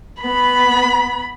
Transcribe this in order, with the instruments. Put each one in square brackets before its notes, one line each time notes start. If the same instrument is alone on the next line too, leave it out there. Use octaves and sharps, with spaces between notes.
[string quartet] B3 [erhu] B5